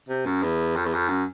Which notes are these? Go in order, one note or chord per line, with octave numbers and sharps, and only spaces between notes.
C3
F#2
E2
F2
E2
F2
F#2